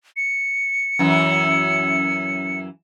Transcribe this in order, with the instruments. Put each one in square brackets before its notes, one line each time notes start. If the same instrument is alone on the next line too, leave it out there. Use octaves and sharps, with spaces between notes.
[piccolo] C#7
[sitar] F#2 E3